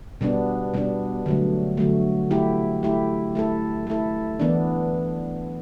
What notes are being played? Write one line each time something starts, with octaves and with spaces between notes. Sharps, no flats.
B2 G3 B3 D4
B2 G3 B3 D4
D3 F#3 A3
D3 F#3 A3
A3 E4 G4
A3 E4 G4
A3 E4 A4
A3 E4 A4
E3 B3 D4